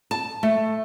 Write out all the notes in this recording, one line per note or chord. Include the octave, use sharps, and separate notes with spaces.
A5
A3